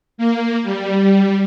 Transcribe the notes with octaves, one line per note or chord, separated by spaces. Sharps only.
A#3
G3